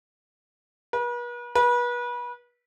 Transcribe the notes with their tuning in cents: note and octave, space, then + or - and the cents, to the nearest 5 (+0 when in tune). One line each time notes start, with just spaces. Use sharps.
B4 -40
B4 -30